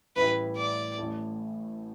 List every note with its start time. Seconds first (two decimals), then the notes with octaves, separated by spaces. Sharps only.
0.16 A1 A2 G3 E4 B4
0.57 D5
0.98 A1 A2 A3